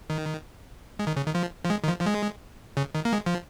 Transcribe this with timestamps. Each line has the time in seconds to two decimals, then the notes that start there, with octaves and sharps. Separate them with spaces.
0.10 D#3
0.99 G#3
1.07 D#3
1.16 C#3
1.26 D#3
1.35 F3
1.65 F3
1.70 G#3
1.84 D#3
1.87 F3
2.01 F3
2.06 G#3
2.77 C#3
2.95 D#3
3.05 A#3
3.13 G#3
3.26 F3